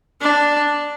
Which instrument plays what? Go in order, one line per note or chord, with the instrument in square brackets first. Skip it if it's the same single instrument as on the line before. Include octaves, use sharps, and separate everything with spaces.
[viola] D4